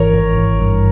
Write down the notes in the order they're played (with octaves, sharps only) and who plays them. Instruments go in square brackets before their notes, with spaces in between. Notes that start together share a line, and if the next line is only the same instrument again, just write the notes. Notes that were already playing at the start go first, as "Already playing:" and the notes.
Already playing: [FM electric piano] G#1 E3 [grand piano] A#4 C#5
[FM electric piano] G#1
G#1
G2